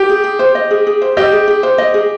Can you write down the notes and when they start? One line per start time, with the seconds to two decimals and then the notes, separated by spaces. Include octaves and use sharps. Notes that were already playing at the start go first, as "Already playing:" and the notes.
Already playing: G4
0.09 G#4
0.24 G#4
0.39 C5
0.55 D#5
0.71 G#4
0.87 G#4
1.02 C5
1.17 G4 D#5
1.32 G#4
1.48 G#4
1.63 C5
1.78 D#5
1.94 G#4